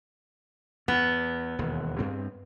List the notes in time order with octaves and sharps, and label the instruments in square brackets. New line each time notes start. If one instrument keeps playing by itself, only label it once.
[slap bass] E2 [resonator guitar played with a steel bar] B3
[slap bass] E1 D#2
G2 C4